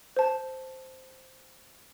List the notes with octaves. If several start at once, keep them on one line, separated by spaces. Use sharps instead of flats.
C5 A5